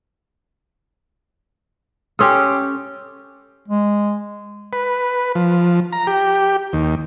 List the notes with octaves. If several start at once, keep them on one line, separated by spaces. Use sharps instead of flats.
C#4 G4 A4 C6 D#6
G#3
B4
F3
A#5
G4
D#2